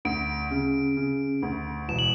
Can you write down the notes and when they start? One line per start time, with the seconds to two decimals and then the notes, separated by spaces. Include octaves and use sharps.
0.05 D2 D7
0.51 C#3
0.97 C#3
1.42 D2
1.88 E1 E7
1.99 F#7